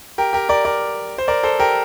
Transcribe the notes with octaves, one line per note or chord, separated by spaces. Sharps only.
G4 A#4
G4 A#4
A#4 D5
A#4 D5
C5
A#4 D5
A4 C5
G4 A#4